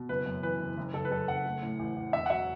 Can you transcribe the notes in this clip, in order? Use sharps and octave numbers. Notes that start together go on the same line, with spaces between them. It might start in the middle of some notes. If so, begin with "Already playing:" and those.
Already playing: B2
F#1 B4
F#2
E3 B4
F#1
F#1
F#1 A4
B4
F#2 A4
F#1 F#5
A3
A2
A1
A1
E1 E5
F#5
F#3 E5